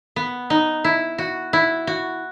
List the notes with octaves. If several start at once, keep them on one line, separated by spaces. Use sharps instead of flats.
B3
D#4
E4
F#4
E4
F#4